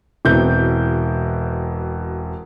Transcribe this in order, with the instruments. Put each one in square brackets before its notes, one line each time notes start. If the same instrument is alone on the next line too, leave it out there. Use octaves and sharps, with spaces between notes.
[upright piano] E1 B2 C4 E4 G6